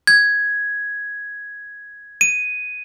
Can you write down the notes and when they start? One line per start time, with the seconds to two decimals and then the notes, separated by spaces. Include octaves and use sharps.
0.07 G#6
2.21 D#7